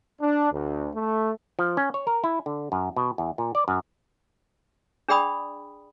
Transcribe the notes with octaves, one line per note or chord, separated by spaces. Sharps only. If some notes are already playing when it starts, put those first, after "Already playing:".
D4
D2
A3
F3
C#4
C#5
A#4
E4
D3
F#2
B2
E2
A#2
D5
F#2
D4 G#4 D5 G5 B5 D#6